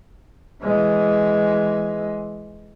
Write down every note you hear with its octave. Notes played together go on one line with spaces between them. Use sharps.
E3 G#3